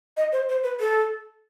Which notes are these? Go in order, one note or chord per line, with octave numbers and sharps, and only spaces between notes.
D#5
C5
C5
B4
A4